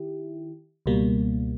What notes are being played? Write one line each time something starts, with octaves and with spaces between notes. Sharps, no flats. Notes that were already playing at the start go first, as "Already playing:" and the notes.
Already playing: D#3 E4 G4
C#2 B2 G3 A#3